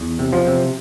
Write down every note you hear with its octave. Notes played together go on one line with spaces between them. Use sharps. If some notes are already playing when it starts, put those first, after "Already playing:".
Already playing: E2
C3
F3
C3